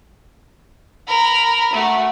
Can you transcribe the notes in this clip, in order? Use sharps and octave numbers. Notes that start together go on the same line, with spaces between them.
A#4 B5
A3 F#4